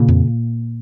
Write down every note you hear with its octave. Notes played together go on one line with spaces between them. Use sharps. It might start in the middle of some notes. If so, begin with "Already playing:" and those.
Already playing: A#2 C#3 A#3
F2